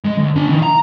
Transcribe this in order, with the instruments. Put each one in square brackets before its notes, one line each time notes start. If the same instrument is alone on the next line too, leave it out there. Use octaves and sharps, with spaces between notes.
[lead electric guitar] G#3
D2
D4 G#5
D#3 E3
A#5